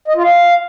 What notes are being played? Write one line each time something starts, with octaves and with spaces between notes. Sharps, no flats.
D#5
F4
F5